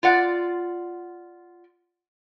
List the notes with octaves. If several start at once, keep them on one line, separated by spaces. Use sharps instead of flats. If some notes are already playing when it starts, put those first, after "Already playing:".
F4 D5 F#5